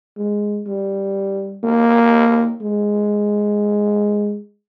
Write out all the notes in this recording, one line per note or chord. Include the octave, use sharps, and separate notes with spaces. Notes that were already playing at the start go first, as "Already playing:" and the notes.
G#3
G3
A#3
G#3